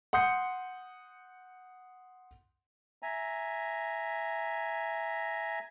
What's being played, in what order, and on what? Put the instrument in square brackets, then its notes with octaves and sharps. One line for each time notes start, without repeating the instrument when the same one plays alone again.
[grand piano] F#5 C6 D#6 G6 C#7
[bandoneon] E5 G#5 A#5